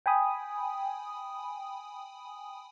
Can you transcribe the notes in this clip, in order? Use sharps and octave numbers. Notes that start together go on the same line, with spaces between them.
G5 G#5 B5 D#6